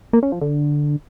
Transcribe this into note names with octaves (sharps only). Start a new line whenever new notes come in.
A#3
C#4
F3
D3